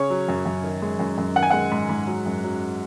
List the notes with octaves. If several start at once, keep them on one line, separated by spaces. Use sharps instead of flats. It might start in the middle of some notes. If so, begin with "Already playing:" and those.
Already playing: C#3 C#5
F#3
F#2
F#2
D#3
G#3
F#2
F#2
D#3 F#5
G#5
G#3 F#5
G#2
G#2
F#3
F#2
F#3